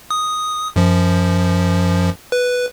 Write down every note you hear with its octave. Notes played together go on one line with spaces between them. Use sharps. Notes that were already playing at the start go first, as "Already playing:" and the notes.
D#6
F#2 F3
B4